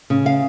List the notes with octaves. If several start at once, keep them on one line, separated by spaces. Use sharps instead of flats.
C#3
F5